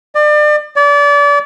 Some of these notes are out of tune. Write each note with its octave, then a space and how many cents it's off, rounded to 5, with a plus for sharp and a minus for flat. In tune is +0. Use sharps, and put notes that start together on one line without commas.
D5 +35
D5 -30